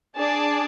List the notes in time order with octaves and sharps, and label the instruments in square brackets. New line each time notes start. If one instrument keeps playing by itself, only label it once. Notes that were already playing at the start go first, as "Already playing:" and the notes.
[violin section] D4 G#4 D5 A5